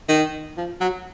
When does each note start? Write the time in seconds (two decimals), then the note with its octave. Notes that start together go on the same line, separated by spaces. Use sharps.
0.09 D#3
0.57 F3
0.81 F#3